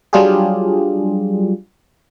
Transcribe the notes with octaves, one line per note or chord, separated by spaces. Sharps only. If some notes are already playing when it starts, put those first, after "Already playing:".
F#3 G3 D4 F4 G4 G#4